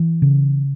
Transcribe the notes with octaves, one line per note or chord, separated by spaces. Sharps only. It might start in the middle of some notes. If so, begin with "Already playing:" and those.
Already playing: E3
C#3